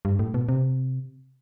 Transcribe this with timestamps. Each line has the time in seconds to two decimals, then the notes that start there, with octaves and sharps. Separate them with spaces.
0.05 G2
0.19 A2
0.34 B2
0.49 C3